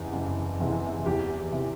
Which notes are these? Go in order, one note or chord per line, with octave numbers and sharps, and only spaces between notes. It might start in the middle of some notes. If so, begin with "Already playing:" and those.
Already playing: F#1 E2 C3 E3
F#1
E2 C3 E3
E2 G4
C3 E3